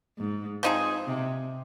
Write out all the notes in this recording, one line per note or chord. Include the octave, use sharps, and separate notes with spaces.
G#2
F3 C4 D#4 G#4
C3